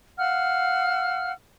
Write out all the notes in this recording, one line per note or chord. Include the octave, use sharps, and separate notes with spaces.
F5 F#5 E6 F6